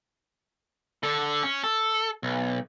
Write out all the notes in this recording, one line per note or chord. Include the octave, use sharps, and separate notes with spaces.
D3 A4
C#4
A4
B1